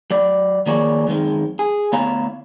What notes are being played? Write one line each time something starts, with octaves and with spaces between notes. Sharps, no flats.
F#3 D5
D#3 F3 A#3 G#4 C#5 D5
F#2 D#3 G#3 C4
G#4
D2 B3 E4 C#5 F5 A#5